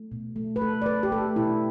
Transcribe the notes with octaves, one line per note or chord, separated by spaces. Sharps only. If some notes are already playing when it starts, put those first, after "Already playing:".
Already playing: A3
B2
A3
B4
A3 A4
D5
A3 B4
G4
A3 A4
B2 E4